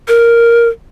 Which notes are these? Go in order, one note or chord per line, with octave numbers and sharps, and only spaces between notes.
A#4